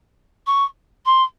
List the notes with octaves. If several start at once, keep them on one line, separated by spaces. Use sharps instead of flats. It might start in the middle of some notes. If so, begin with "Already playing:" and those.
C#6
C6